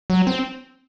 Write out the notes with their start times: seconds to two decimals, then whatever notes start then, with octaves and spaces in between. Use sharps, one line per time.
0.10 F#3
0.27 C4